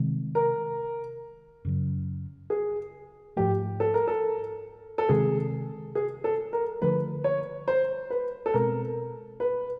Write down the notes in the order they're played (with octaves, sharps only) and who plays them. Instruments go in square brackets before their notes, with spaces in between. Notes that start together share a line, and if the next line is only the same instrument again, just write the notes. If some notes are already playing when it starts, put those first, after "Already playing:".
Already playing: [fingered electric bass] C3 D#3 G#3
[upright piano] A#4
[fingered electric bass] F#2 C#3 F#3
[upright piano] G#4
[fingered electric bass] G#2 F3 A3 [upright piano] G4
[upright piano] A4
A#4
A4
A4
[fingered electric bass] C3 D#3 G#3 [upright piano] G#4
[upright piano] G#4
A4
A#4
[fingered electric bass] D3 F3 A3 D4 [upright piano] B4
[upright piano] C#5
C5
B4
A4
[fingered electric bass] B2 G#3 C4 [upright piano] A#4
[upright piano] B4